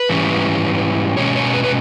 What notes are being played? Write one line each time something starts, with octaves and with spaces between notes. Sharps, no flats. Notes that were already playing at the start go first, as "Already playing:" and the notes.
Already playing: B4
G#2 E3 G3 C#4
B2 G#3 C#4 C#5
C#5
B4
B4